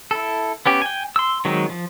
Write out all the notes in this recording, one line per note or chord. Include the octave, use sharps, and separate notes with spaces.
E4 A4
B3 C#4 G4
G5 G#5
C6 E6
D#3 F#3 G#3 C4
F3